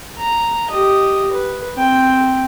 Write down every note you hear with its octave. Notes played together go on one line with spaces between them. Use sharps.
A#5
G4 D#5
B4
C4 G5